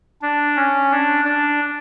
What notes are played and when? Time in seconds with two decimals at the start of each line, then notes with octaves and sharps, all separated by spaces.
0.22 D4
0.56 C#4
0.91 D4
1.24 D4